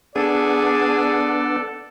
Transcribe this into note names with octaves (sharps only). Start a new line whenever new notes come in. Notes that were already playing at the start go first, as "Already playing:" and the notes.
B3 D4 G#4 A4 D5